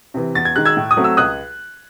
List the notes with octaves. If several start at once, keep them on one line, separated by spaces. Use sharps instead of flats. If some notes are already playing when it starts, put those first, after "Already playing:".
C3 E3
E2 A6
G#6
D#3 G#3 F#6
E6 G#6
A2
D#6
F#3 A3 C4
E6
C#2 D#6 F#6